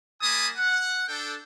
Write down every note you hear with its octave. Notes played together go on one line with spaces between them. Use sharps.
G3 A#3 G#5 A5 B5 D#6
F#5
D4 A4 G5